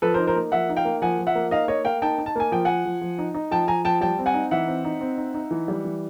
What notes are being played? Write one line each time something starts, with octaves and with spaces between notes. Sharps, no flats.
F3 A4 B4
A#4 C5
D#4
A#4 C5
A#3
F3 E5 F#5
D#4
F5 G5
A#3
F3 F#5 G#5
F3
E5 F#5
A#3
D#4 D#5 F5
A#3 C#5 D#5
A#3 F5 G5
D#4 G5 A5
D#4
A5
A#3 G#5
F3 G5
F3 F#5 G#5
F3
F3
D#4
D#4
F3 G5 A5
F3 G#5 A#5
F3 G5 A5
G3 G5 A5
C4
F#5 G#5
D#4
E3 E5 F#5
C4
D#4
C4
D#4
D#4
E3
G3
E3